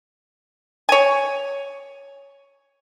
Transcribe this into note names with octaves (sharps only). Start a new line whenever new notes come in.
C#5 G#5